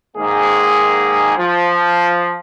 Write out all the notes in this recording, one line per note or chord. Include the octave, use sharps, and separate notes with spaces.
G#2 D#3 G#3 A#3 G#4
F3